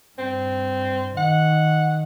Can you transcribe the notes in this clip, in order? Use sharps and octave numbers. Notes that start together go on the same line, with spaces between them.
G2 C4
D#3 F#5